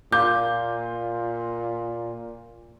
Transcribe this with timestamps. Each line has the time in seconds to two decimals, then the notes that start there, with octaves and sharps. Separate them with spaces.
0.12 A#2 F4 D6 G6